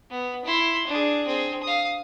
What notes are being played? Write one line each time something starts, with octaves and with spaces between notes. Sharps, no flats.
B3
E4 C6
D4 G#4
C4 G#4
F5 D#6